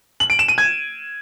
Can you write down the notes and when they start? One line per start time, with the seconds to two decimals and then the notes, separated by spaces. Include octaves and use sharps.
0.20 F#7
0.30 D7
0.39 E7
0.48 D#7
0.58 G#6